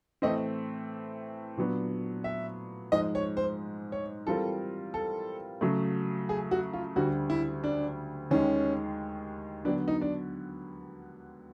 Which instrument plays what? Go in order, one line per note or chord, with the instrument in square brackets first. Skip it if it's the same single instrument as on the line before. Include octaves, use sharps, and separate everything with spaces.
[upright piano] A2 E3 A3 C4 [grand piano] D#5
[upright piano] A#2 F#3 B3 D4
[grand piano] E5
[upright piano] G#2 F3 G#3 [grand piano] D#5
[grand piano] C#5
C5
C#5
[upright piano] E3 G3 C4 F4 A#4 [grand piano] A4
[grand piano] A4
[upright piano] C#3 F#3 A3
[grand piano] G#4
F#4
F4
[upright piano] D2 D3 G3 [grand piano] F#4
[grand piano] E4
D4
[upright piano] D#2 D#3 G#3 [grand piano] C#4
[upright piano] D3 F#3 B3 [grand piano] D4
[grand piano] D#4
D4